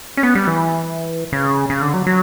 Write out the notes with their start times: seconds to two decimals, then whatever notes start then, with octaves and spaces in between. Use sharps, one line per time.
0.17 C#4
0.23 B3
0.35 G3
0.47 E3
1.32 C#3
1.70 C#3
1.82 D3
1.94 F#3
2.06 F#3